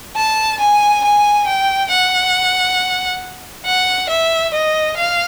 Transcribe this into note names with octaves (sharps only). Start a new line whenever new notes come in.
A5
G#5
G#5
G5
F#5
F#5
E5
D#5
F5